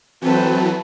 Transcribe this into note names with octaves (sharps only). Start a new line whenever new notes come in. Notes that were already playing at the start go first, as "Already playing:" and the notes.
E3 F#3 C4 A4 B4